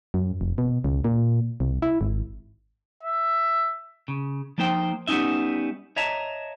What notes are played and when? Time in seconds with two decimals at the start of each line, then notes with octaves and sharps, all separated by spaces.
0.14 F#2
0.41 F1
0.58 B2
0.84 C#2
1.04 A#2
1.60 C2
1.82 E4
2.01 G#1
3.03 E5
4.08 C#3
4.58 F3 A#3 D#4 C5 G5
5.07 G3 B3 C#4 D#4 E5
5.96 C#5 D#5 E5 A5 A#5